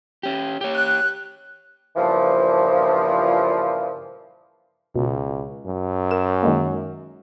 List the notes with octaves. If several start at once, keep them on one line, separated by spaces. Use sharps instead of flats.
C#4 G4
G4 C#5
F#6
G2 A#2 C#3 E3 F3
C#2 B2
F#2
A#4 E7
D#3 G#3 A#3